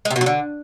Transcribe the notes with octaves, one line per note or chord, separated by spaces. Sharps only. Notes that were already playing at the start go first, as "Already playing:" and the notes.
G#3
C3
B2
F#3
D3